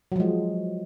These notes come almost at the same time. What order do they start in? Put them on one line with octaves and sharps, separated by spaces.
F#3 F3 G#3